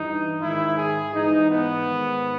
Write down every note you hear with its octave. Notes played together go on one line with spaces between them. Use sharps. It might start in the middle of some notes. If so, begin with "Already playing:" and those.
Already playing: G2 E3 D#4
G#2 D#3 E4
G#4
G#2 E3 D#4
B3
G#2 D#3